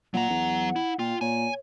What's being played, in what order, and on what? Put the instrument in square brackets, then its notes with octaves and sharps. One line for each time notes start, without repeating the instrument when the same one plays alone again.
[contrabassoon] A#2 [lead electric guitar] F#3 A#5 [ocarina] F#5
[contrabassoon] E2
[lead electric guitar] E4
[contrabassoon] A#2 [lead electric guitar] F4 [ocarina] G5
[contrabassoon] A#2 [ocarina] C#5 [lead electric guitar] G#5